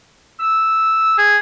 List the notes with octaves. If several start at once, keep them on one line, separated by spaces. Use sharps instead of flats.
E6
G#4